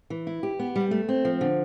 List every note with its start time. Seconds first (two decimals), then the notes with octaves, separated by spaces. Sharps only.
0.10 E3
0.27 E4
0.43 G4
0.59 B3
0.76 G3
0.91 A3
1.09 C4
1.25 F3
1.41 D3